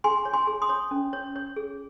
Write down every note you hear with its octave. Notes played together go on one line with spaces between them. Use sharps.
G#4 G#5 C6
C#5
G#5 C6
G#4
C6 D#6
C#5
C#4
C#5
C#5
G#4